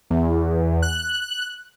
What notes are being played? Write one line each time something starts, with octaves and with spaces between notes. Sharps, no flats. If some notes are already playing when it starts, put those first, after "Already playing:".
E2
F#6